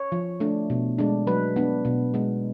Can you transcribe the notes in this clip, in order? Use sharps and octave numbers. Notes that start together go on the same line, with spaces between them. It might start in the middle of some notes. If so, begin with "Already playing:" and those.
Already playing: C#5
F3
A3 D4
B2
G#3 D4
F#3 B4
B3 D4
B2
G#3 B3